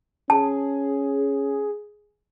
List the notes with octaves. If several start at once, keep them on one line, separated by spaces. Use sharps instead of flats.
C#4 G#4 A5